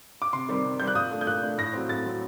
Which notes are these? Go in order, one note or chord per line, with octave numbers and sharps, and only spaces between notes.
D6
C3 C6
D#3 G3 C4
C3
D#3 G3 C4 G6
F#6
A#2 D#6
A3 D4
G6
A#2 F#6
A3 D4
A2 A#6
F#3 C4
A2 A6
F#3 C4